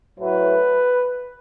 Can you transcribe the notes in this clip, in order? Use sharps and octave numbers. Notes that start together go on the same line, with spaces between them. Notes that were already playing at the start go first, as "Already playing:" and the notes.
A2 F#3 A3 B4